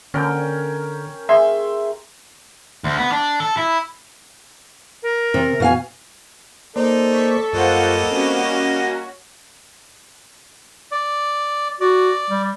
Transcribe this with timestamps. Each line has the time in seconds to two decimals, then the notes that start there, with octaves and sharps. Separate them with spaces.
0.14 D3 C#4 A#4 G5
1.29 G#4 E5 C6
2.84 D2
2.98 B3
3.12 D4
3.40 A4
3.57 E4
5.03 A#4
5.34 C3
5.60 B2 F5 G#5
6.76 A#3 D#4 A4 C5 D5
7.11 C#6 B6
7.53 F#2 G3 A#3 F4 C5 D#5 F#5 C#6
8.11 C4 C#4 F#4
8.43 A#5
10.91 D5
11.81 F#4 D5
12.30 G3